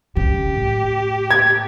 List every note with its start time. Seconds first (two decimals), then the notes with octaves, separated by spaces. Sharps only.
0.16 C#3 G4
0.56 A2
1.31 G#6